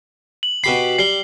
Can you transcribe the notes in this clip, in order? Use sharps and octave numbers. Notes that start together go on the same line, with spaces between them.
F#7
B2 G4 B5 C7
G3 C7 G7